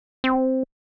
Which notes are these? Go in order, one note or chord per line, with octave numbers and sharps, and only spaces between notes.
C4